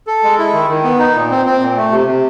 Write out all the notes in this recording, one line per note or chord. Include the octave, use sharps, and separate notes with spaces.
A4
G#3
E4
D#3
D#3
B3
D#4
A#2
C4
C4
A#2
A3
C3
C3